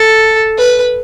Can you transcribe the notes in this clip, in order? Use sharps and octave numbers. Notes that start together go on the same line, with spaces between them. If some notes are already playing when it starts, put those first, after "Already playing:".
Already playing: A4
B4